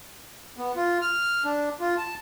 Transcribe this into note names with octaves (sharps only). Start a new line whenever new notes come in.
B3
F4
F6
D4
F4
A5